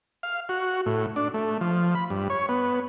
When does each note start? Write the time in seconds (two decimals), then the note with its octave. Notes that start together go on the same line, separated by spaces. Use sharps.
0.23 F5
0.49 F#4
0.86 A2
1.16 D4
1.34 A3
1.61 F3
1.95 B5
2.10 G2
2.30 C#5
2.49 B3